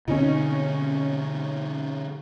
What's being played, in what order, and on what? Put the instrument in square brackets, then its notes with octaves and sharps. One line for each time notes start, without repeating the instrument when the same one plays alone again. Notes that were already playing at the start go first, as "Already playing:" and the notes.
[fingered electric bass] B2 D3 C4 [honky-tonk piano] C#4 D#4